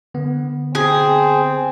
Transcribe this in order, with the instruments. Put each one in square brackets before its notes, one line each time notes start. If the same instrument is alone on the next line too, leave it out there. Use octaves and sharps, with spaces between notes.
[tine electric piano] D3 B3
[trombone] C4 [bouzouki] G#4